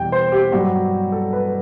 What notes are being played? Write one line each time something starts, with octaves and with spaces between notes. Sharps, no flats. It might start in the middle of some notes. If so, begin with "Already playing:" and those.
Already playing: E2 B2 G3 G5
C5
G4
G2 F#3 F#4
A4
B4